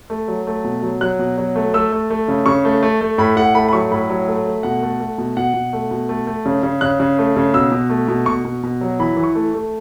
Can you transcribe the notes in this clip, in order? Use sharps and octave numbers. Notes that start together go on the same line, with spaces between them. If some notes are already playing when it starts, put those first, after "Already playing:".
A3
F#3
A3
B2
F#3
F#3 F#6
B2
F#3
A3
A3 E6
A3
A3
C#3
C#3 C#6
A3
A3
A3
A2 B5
A2 F#5
A3 B5
B5
F#3 C#6
A2 B5
F#3
A3
A3
B2 F#5
A3
A3
B2
B2 F#5
B2
A3
B2
A3
A3
C#3
C#3
C#3 F#6
C#3
A3
C#3
B2 E6
B2
A3
B2
B2 C#6
B2
B2
F#3
E3 B5
E3
C#6
A3
A3